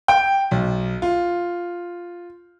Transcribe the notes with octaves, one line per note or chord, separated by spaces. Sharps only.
G5
B1
F4